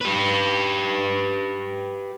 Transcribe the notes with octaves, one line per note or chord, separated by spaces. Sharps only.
G4 B4